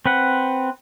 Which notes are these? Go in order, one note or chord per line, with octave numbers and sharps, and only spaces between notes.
C4 B4 F#5